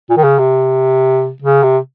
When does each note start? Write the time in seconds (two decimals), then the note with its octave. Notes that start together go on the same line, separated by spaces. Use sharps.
0.10 A#2
0.17 D#3
0.23 C#3
0.39 C3
1.42 C#3
1.63 C3